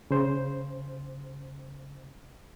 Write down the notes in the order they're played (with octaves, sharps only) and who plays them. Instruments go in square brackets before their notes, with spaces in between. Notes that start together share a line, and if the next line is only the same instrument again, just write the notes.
[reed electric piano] C#3 C5